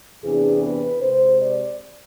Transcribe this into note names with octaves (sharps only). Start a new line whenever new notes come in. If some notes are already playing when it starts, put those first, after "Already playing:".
E2 C3 E3 B3 D4 G#4
B4
C3 G#3 C4 C5
D5